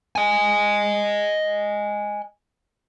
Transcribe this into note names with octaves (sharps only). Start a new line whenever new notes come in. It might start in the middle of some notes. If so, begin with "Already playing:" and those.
D#5 G#5